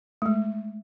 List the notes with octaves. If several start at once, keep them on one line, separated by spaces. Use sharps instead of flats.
G#3 A3